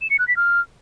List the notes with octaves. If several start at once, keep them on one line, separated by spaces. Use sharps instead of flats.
E7
C#7
F#6
B6
F6